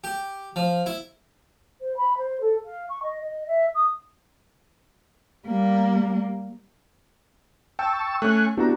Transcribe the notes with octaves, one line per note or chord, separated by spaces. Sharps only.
G4
F3
E4
C5
B5
C5
A4
F5
C#6
D#5
D#5
E5
D#6
G3 A#3
G5 A5 C#6 E6
A3 C#4 G#5 C#6 F#6
B3 D4 E4 F#4 G4 A#5